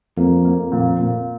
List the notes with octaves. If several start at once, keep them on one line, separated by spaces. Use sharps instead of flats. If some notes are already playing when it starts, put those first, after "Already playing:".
F2 A#3
A#3
F2 A#2
A#2